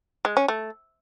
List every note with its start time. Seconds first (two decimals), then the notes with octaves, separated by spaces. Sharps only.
0.25 G#3
0.37 C#4
0.48 A3